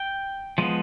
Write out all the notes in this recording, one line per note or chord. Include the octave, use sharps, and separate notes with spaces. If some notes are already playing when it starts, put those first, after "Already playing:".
Already playing: G5
F3 G#3 B3